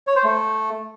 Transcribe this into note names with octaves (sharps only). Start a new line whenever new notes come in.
C#5
C5
A3